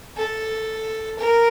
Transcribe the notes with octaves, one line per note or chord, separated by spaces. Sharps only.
A4
A#4